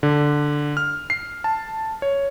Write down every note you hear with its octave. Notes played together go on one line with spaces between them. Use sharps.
D3
F6
C7
A5
C#5